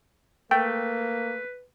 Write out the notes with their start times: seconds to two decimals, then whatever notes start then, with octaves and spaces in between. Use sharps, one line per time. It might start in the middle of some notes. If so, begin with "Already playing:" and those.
0.51 A3 A#3 B4 G5